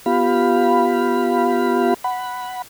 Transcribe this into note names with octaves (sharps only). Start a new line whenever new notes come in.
B3 F4 G4 F5 B5
F#5 B5